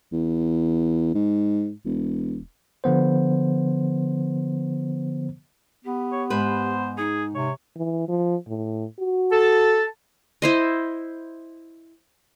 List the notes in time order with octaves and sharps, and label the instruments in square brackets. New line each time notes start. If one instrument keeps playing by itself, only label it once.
[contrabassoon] E2
G#2
E1
[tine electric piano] D3 F3 B3 C5
[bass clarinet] B3 [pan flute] G4
[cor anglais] C#5
[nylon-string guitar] G#2 B4 [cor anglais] C5
[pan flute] D#4 [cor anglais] G#4
[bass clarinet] C3 [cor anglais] C#5
[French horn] E3
F3
A2
F#4
[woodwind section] A4 A5
[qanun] E4 C5 D#5